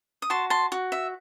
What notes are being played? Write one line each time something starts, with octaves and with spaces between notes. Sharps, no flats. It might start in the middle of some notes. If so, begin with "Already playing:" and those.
D#6
F#4 A5 C6
A5 C6
F#4
E5